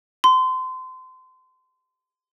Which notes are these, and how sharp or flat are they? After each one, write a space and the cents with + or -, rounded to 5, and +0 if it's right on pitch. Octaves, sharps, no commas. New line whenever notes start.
C6 -30